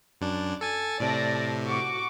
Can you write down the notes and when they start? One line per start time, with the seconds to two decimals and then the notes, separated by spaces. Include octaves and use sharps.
0.21 F#2 D4
0.61 A4 G#5 A6
1.00 A2 C3 D5 A5 A#6
1.64 F#4 C#6 D6